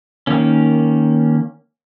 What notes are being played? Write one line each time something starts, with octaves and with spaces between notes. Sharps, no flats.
D#3 A#3 C#4